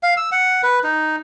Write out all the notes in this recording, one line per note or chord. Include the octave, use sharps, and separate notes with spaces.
F5
E6
F#5
B4
D#4